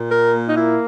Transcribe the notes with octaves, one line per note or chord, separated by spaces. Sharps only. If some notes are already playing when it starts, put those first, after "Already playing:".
Already playing: A#2
A#4
A#3
D#4
E4